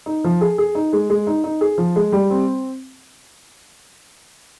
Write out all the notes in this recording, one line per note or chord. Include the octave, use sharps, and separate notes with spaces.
D#4
F3
G#4
G#4
D#4
G#3
G#3
D#4
D#4
G#4
F3
G#3
G3
C4